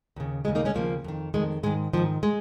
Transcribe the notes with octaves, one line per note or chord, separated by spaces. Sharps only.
D#2 C#3
D#2 C#3 G#3
A#3 D#4
G#3 C#4
D#2 C#3 F3 A#3
F2 D#3
F2 D#3 G#3
G#2 D#3 G#3
G#2 D#3 F3
G#3